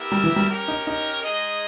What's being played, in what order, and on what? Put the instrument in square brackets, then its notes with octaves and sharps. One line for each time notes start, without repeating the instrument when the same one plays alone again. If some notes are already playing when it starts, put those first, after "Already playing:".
Already playing: [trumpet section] B3 E4 G4 A#4 E5
[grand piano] G3
E3
G3
[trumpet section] C#4 G4 A#4
[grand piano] D#4
D#4
[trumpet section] G#3 D#4 G#4 D#5